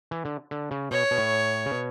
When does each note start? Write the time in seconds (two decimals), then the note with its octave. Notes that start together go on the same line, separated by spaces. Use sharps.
0.11 E3
0.25 D3
0.51 D3
0.71 C#3
0.91 B2 C#5
1.11 B2
1.18 A2
1.66 C#3
1.71 B2